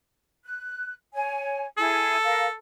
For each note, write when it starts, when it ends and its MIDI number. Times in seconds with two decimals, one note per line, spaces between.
0.44 0.92 90
1.14 1.65 73
1.14 1.65 80
1.78 2.16 64
1.78 2.16 68
1.78 2.55 69
2.24 2.46 70
2.24 2.46 77